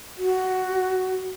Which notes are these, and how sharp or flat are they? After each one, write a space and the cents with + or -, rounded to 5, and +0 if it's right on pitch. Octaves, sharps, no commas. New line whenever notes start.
F#4 +10